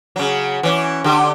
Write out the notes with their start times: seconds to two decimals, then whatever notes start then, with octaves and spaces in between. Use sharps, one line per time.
0.16 C#3 F#3
0.63 E3 C#4
1.04 D3 G4